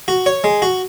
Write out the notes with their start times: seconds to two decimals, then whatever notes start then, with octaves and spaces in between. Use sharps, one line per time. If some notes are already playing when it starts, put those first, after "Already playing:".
0.08 F#4
0.26 C#5
0.44 G#3
0.62 F#4